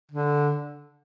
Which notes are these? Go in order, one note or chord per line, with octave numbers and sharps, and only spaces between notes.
D3